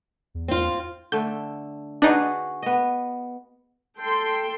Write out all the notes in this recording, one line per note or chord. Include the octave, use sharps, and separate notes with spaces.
E2
C4 F4
D3 A3 G6
D4 D#4 F#4 G#4 B4
B3 D#5
A4 G5 C6